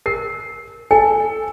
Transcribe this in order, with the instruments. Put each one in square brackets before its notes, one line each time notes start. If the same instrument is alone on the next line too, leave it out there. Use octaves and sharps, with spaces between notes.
[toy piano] A#4 [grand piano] C7
[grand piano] A4 [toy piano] G#5